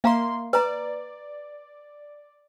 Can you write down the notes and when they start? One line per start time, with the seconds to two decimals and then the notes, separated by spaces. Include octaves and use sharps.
0.04 A#3 E5 F5 A#5 C6
0.53 B4 D5 A#5